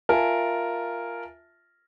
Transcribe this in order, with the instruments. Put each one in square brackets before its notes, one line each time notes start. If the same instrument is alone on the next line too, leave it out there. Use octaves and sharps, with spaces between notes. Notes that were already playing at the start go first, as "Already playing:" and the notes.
[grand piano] F4 A#4 E5 G#5 A5